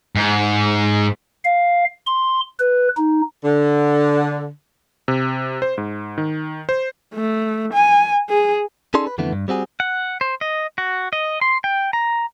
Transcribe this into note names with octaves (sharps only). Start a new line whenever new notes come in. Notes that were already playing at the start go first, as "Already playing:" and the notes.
G#2
F5
C6
B4
D#4
D3
C3
C5
G#2
D#3
C5
A3
G#5
G#4
C#4 D#4 G#4 A4 D5 C6
B4
F2 D3 E3 A3 B3
G2
G3 C4 F#4 G#4
F#5
C5
D#5
F#4
D#5
C6
G5
A#5